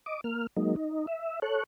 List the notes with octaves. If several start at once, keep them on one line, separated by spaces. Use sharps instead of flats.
D#5 D6
A#3 F6
F#3 G#3 A#3 D#4
D#4
E5
A4 C#5 F#6